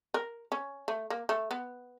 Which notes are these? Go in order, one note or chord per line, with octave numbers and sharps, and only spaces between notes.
A#4
C#4
A3
A#3
A3
B3